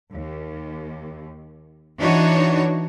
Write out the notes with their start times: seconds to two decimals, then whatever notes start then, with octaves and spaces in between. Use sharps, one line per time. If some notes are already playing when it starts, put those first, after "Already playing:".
0.12 D#2
1.97 E3 D4 D#4 F#4 C#5